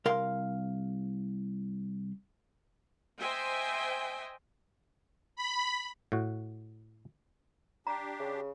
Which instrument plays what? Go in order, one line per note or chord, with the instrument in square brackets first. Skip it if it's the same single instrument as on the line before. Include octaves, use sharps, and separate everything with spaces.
[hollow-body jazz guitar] C2 A#4 F5 C6
[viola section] C5 D#5 E5 G5 G#5
[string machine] B5
[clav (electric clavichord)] A2 F#4
[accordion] D4 G4 [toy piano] A#5
[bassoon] C#3